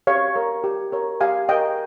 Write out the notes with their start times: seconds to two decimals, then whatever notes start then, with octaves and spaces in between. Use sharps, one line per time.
0.07 G4 C#5 F5
0.36 A#4 C#5
0.64 G4
0.92 A#4 C#5
1.21 G4 F5 G#5
1.48 A#4 C#5 D#5 G5